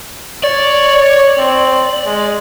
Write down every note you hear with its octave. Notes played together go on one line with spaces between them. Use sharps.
C#5 D5
C4
G#3